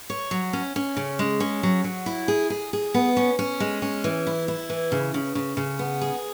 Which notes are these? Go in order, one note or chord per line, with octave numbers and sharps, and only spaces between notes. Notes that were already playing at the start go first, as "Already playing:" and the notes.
C#5
F#3
C#4
C#4
C#3
G#3
C#4
F#3
F#3
E4
G#4
G#4
G#4
B3
C#4
C#4
G#3
C#4
E3
E4
E4
E3
C#3
C#3
C#3
C#3
B3
G#4